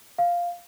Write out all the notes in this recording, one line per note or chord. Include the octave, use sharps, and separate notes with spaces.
F5